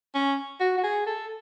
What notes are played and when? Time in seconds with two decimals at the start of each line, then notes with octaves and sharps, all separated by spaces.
0.15 C#4
0.60 F#4
0.78 F#4
0.83 G#4
1.06 A4